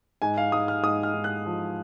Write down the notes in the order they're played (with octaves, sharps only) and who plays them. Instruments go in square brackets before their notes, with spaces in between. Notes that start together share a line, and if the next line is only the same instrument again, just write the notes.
[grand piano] G#2 G#5
F5
G#2 D#6
F6
G#2 D#6
F6
G#2
F#6
F3